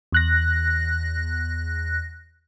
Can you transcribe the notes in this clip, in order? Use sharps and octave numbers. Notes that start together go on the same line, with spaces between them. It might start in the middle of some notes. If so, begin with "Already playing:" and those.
E2 F#6 A#6